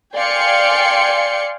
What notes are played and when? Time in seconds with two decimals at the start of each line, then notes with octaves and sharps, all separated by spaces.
0.15 D5 F5 G5 G#5 C6 C#7